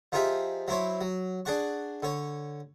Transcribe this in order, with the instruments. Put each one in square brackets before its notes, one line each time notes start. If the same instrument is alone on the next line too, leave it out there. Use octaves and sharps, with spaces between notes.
[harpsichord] F3 D#4 F4 G4 G#4 E5
F#3 E4 C5 C#5
F#3
D4 G#4 D5 F#5 C#6
D3 C#5